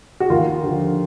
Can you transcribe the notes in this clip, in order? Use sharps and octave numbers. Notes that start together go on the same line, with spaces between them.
F#4
D#2 F4
D3 F3